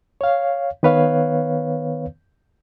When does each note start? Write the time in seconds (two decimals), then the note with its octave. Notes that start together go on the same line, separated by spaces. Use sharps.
0.21 C#5 F5
0.83 D#3 B3 B4 C#5 F5